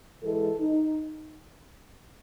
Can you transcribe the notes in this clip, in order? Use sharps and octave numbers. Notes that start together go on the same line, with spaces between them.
G#2 E3 G#3 A4
D#4